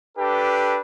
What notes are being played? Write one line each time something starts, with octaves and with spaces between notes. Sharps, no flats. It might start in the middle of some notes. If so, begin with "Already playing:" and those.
D4 G4 A4 B4